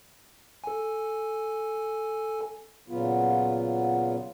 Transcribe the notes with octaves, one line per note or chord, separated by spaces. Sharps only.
A4 G#5
A#2 C#3 F#3 B3 F4